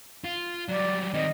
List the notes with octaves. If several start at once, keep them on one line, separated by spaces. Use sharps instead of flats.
F4
F#3 G3 D5
D#3 C4 D#5